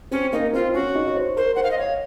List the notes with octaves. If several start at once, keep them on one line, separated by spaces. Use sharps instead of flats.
C4 C#4
A#3 D#4
C4 F4
C#4 F#4
D#4
C#5
C5
A#4 C5
C5 F#5
F5
D#5
C#5 F5